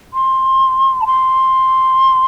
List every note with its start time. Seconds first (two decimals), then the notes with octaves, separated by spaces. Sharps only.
0.13 C6
1.01 A5
1.06 C6